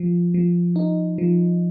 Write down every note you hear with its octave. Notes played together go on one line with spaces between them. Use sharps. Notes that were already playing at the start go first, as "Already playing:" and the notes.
Already playing: F3
F3
D#4
F3